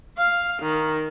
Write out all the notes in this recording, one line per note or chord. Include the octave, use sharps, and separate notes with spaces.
F5
D#3